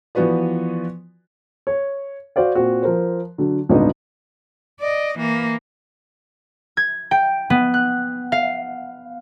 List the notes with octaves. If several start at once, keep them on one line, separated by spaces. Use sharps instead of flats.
E3 F3 B3 F#4 B4 D5
C#5
F#4 C5 D5 F5
A#2 C4 F#4
F3 A#4 C5
D3 F#3
D#1 G#1 D3 B3 D#4 D#5
D5 D#5
E3 A#3
G#6
G5
B3
F#6
F5